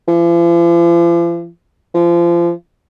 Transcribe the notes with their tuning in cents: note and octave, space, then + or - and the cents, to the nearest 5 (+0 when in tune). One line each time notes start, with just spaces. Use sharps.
F3 -45
F3 -30